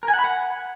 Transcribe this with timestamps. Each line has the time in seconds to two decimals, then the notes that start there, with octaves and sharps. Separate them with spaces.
0.03 A#4
0.08 G#5
0.14 F#5
0.19 B5
0.24 F#5